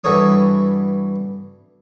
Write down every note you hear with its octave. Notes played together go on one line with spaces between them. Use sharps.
G2 E3 F#4 A4 C#5 D#6